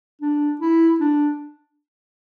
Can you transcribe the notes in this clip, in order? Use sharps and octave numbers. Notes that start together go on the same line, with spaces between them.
D4
E4
D4